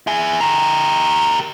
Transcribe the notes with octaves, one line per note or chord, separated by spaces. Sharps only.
E4 G#4
G4 A#4